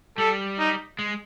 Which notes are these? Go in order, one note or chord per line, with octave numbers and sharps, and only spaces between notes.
G3 A4
D#4
G#3